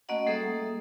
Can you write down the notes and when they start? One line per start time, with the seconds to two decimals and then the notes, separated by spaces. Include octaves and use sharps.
0.09 A3 A#3 C#4 F#4 D#5 F#5
0.27 G3 A#3 G#4 A4 E5 D#6